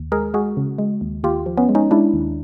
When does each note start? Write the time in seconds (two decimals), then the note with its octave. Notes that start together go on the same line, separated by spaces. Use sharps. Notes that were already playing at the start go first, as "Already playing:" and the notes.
Already playing: D#2
0.12 G#3 G#4 A#4
0.34 G#3 F#4 G#4
0.57 C#3
0.78 G#3
1.01 D#2
1.23 D#2 F4 G4
1.46 F3
1.57 B3 C#4
1.69 G#3
1.75 C#4 D#4
1.91 G#3 D4 E4
2.13 D#2